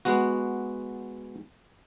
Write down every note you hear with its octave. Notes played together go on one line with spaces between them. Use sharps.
G#3 B3 F#4